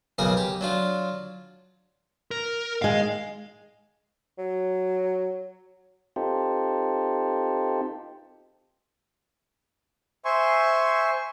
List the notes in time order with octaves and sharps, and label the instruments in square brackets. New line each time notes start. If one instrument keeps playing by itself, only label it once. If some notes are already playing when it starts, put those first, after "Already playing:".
[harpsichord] B1 C#3 F#3 G#4 A#4 G#5
G4
F#3 D4 F4
[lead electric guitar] A#4
[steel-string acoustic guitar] D#3 G#3 [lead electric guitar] F5
[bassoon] F#3
[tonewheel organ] C4 D#4 F4 G4 A4
[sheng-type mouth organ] C5 E5 G#5 C6 C#6